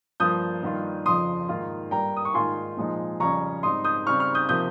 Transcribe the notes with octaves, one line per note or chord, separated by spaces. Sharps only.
G2 F3 A#3 D#6 G6
G2 D#3 A#3 F4
F2 C#3 F3 C6 D#6
G#2 D#3 A#3 F4
G2 G3 A#3 G5 A#5
D#6
C#6
G#2 D#3 A#3 F4 G#5 C6
A#2 F3 G#3 D#4
F2 C#3 G3 C#4 A#5 C#6
G#2 G3 C4 D#4 C6 D#6
D#6 G6
C#3 G3 C4 C#6 F6
C#6 F6
D#6 G6
C3 F3 A#3 D#6 G6